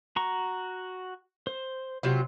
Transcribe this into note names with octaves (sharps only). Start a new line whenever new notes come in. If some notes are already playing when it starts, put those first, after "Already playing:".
F#4 A#5 C#6
C5
C3 F#3 F4